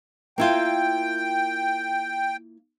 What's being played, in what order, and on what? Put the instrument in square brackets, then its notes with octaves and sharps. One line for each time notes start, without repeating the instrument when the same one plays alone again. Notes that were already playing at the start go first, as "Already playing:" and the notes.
[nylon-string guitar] A#3 E4 F4 [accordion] G5